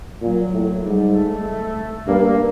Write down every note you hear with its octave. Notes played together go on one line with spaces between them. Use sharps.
A#2 F#3
A2
G#2 G3
A3
A3
G2 A#3